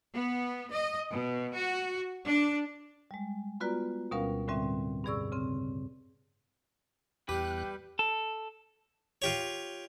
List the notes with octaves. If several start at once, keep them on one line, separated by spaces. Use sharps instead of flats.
B3
D#5
B2
F#4
D4
G3 G#3
B3 F4 F#4 B4 D5 A#5
D2 B2 G3 C#4 A#4 F5
A2 D3 G3 C4 E5
G2 B2 G#4 D5 C#6 E6
C#3 C4
E2 G3 G4 B4 G5 F#6
A4
F4 G4 C#5